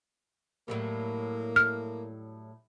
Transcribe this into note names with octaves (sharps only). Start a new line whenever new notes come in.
A2 F#3 G3 A#3
F6